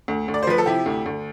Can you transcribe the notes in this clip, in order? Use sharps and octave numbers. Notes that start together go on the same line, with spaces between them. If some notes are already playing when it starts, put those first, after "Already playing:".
D2
D2
D5
C5
F3 B4
A4
C3 E4 G4
D2
D2